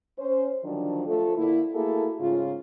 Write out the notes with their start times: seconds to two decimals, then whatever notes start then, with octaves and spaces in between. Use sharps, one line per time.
0.18 C#4 C5
0.64 D3 D#3 F3 F#3 D4
1.07 F3 A3 A4
1.37 D3 A#3 E4
1.74 A3 A#3 E4 F#4 G#4 A4
2.20 G#2 C#3 F4